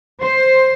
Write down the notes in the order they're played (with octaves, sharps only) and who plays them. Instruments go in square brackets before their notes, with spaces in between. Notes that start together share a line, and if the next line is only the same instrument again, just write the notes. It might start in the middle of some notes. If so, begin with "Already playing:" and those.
[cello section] C5